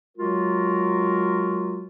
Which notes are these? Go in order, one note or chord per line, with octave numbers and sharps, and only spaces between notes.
F#3 G#3 F4 F#4 A#4